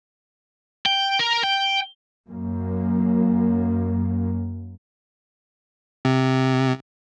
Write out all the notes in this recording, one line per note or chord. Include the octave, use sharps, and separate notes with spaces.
G5
A#4
G5
F#2 A#3
C3